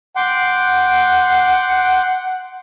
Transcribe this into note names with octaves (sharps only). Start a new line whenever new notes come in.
F#5 G5 C6 D6